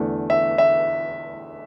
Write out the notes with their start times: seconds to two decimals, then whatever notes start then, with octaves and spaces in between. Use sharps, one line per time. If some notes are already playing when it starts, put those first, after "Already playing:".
Already playing: E2 D3 A3
0.30 E5
0.58 E5